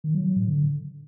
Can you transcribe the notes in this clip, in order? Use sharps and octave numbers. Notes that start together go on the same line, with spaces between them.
D#3
F#3
F#3
A2
D3